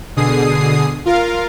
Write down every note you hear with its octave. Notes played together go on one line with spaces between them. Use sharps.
B2 D3 G#4 D#6 C7
F4 A#4 F5